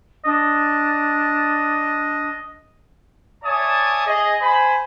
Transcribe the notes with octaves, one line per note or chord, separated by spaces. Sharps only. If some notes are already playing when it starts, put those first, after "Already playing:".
D4 D#5
C#5 D5 E5 G#5 A5 D#6
G#4 D#5
C5 G#5 B5